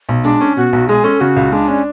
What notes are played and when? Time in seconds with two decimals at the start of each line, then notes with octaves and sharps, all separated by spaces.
0.09 B1
0.24 G#3 D4
0.41 C#4
0.56 B2 F#4
0.73 B1
0.88 G#3 G#4
1.04 C#4 A4
1.21 C#3 F#4
1.36 C#2
1.52 G#3 D4
1.68 C#4 D4